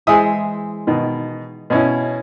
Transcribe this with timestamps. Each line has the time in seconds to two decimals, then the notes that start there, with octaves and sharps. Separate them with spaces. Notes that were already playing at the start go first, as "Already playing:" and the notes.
0.07 E3 G#3 C5 E5 G#5 D#6
0.87 B2 D#3
1.70 B2 C#4 E4